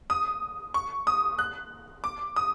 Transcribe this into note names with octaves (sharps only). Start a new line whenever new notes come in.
D#6
C#6
D#6
F#6
D6
D#6